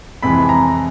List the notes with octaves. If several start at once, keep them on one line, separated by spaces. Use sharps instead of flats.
F2 C3 E3 G#3 B5
A#5